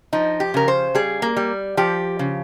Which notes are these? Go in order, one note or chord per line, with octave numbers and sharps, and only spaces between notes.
F3 D#4
G4
C#3 A#4
C5
G3 G#4
A#3
G3
F3 G4
C#3